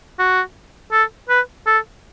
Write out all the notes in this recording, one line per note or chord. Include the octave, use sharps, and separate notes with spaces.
F#4
A4
B4
A4